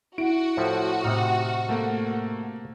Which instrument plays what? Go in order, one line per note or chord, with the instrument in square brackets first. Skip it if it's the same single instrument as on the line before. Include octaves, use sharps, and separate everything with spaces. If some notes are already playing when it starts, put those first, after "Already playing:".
[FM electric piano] E4 [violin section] F#4 [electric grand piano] D7
[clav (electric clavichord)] A2 F3
[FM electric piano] A2 F6 [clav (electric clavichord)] C3 D#4
[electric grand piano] A3 A#3